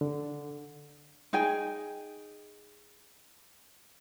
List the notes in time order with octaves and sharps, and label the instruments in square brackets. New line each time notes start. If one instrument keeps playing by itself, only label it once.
[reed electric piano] D3
[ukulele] D#4 G#4 G5 G#5